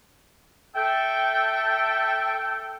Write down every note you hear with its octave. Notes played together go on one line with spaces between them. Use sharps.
A4 E5 G5